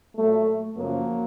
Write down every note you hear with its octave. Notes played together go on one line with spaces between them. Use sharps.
A#2 F#3 A3
F#2 C#3 F3 F#3 A#3